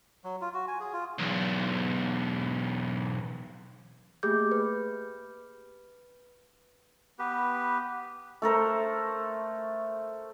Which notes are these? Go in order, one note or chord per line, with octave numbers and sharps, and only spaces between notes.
F#3
F4
F#4
G#5
G#4
F4
B1 E2
A3 A#3 G4 G#4 D6 G6
B4
B3 G4 B4
A3 A4 A#4 C5